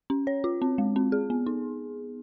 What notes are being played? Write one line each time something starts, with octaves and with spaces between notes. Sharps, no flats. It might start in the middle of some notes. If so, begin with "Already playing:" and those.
C#4
C#5
F4
C4
G#3
C4
G#4
B3
D#4